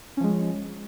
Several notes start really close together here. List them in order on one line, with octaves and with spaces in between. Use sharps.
C#4 F3 G#3